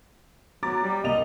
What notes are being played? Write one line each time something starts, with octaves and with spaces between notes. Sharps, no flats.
F#3 A#5 D6 A6
G3
C2 A#3 D#5 F7